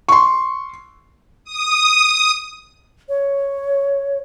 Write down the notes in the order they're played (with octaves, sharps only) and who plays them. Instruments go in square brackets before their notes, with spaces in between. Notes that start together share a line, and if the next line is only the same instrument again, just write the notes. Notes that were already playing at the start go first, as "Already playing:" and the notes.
[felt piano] C6 C#6
[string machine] D#6
[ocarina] C#5